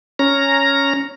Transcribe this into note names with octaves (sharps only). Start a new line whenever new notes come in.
C#4 A#5